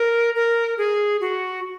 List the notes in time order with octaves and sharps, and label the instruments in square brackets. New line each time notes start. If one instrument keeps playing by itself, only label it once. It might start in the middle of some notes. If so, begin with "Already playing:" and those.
Already playing: [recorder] A#4
A#4
G#4
F#4